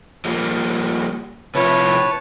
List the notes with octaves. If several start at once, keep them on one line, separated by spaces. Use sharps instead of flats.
F3 G3 A#3
C3 F3 E4 B4 C#5 A5